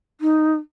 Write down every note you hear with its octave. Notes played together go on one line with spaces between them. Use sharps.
D#4